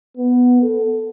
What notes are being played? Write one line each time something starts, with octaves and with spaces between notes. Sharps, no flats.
B3
A4